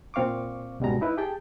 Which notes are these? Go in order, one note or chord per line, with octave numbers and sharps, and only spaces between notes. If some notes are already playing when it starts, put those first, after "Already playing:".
A#2 C4 F5 C#6 D6
C#2 G#2 B2 G3 G#3 A#5
D#4 E4 B4
G4 G#4 G5 A5